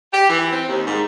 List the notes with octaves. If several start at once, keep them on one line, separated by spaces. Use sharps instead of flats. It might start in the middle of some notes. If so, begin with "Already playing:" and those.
G4
E3
C4
D#2
G#2